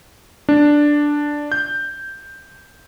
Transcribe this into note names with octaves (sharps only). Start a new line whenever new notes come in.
D4
G6